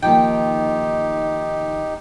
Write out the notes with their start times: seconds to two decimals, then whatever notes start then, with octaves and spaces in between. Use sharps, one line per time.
0.02 D#3 F3 A#3 D#4 G4 G5